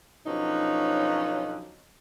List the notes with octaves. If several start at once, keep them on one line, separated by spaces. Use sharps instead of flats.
B2 D3 F3 F#3 C#4 D#4